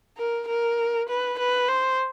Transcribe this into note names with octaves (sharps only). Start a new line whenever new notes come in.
A#4
A#4
B4
B4
C5